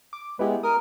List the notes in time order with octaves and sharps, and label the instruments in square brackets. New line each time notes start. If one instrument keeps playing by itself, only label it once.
[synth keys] D6
[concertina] G#3 [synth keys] B3 E4 G4
[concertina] A#4 [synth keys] D#6